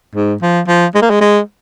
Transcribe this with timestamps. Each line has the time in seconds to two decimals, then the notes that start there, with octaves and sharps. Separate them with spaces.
0.15 G#2
0.42 F3
0.67 F3
0.95 G#3
1.02 A#3
1.10 G#3
1.21 G#3